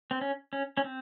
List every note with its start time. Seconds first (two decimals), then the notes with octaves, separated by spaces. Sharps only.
0.11 C4
0.21 C#4
0.53 C#4
0.77 C#4
0.84 C4